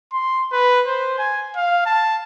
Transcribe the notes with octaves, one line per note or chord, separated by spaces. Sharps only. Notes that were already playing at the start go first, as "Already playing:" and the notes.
C6
B4
C5
G#5
F5
A5